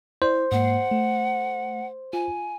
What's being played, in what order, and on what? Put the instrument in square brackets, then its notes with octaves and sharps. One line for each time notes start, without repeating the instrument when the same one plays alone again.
[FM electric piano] E4 D5 [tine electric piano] C5
[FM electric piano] G#2 A#3 C7 [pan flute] F#5
[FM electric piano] A3
[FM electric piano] F4 [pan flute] G#5